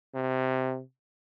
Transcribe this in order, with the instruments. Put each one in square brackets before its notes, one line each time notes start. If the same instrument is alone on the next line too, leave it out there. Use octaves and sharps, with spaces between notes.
[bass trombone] C3